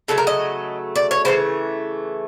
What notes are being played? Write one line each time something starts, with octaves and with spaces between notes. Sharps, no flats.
C#3 F#3 A3 A4
A#4
D#5
D5
C#5
C#3 E3 A3 C5